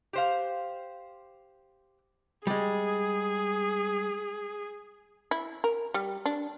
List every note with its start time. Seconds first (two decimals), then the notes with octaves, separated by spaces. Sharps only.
0.13 G4 C5 F5
2.47 G3 G#3 G#4
5.31 E4
5.64 A#4
5.94 G3
6.26 D4